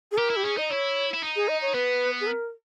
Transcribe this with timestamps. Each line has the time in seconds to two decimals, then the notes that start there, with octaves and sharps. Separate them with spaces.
0.12 G#4
0.17 G4 A#4
0.30 E4
0.36 G4
0.43 C#4 G#4
0.57 D#4 D#5
0.70 E4 C#5
1.13 E4
1.22 D#4
1.36 G#4
1.48 D#5
1.62 C#5
1.74 B3 B4
2.21 G#4
2.27 A#4